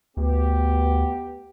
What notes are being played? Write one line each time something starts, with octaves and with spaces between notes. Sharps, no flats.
D2 B3 G4